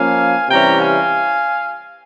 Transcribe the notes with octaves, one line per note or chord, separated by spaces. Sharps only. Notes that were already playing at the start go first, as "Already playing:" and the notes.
Already playing: F3 A#3 C#4 F5 G#5
C3 E3 G3 C#4 G5 A#5
F5 G#5